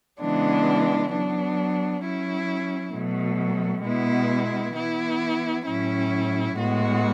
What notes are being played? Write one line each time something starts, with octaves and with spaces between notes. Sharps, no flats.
C#3 E3 G#3 B3 D4
F#3 B3 D4
F#3 C#4 E4
B2 F#3 A3
B2 G#3 B3 E4
E3 B3 E4
A2 F#3 C#4 E4
A2 G#3 B3 F#4